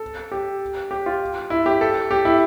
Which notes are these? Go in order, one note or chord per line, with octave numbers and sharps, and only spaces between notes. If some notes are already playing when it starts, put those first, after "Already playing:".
Already playing: A4
G4
G4
F4
E4
G4
A4
G4
E4